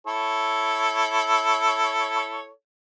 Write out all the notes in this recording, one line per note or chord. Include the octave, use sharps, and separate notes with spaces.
E4 A4 C#5